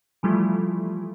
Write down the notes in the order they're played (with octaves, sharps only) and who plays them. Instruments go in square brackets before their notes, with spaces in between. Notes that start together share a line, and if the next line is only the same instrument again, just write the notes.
[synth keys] E3 F3 G3 A3 E4 F4